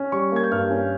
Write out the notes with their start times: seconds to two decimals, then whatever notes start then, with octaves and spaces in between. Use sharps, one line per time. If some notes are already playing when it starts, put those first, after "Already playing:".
Already playing: C#4
0.12 G3 C#6
0.32 A#3 G#6
0.44 G6
0.51 G2 F6
0.71 C#4